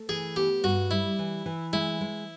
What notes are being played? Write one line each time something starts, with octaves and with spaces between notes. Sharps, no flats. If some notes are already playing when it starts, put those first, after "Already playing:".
Already playing: A3
E3 G#4
B3 G4
G2 F#4
G3 E4
E3
E3
G#3 E4
G#3